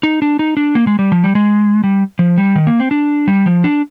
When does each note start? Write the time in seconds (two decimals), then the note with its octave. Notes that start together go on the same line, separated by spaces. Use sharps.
0.03 D#4
0.22 D4
0.39 D#4
0.57 D4
0.75 A#3
0.87 G#3
0.99 G3
1.12 F3
1.24 G3
1.35 G#3
1.84 G3
2.19 F3
2.38 G3
2.56 D#3
2.67 A#3
2.80 C4
2.91 D4
3.28 G3
3.46 F3
3.64 D4